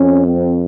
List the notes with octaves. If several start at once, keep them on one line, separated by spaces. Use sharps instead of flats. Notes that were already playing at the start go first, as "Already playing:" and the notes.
Already playing: F2 C#4
C4